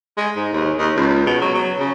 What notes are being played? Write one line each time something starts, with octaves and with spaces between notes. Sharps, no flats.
G#3
G#2
D#2
D#2
C#2
B2
F#3
F#3
C#3